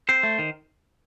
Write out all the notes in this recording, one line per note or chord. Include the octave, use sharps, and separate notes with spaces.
C4 C5
A3
D#3